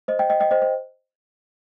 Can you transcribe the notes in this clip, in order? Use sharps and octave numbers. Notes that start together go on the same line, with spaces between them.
C5 D#5
D#5 G5
D#5 G5
D#5 G5
C5 D#5
C5